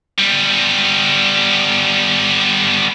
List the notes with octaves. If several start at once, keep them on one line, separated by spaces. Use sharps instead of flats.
G3 B3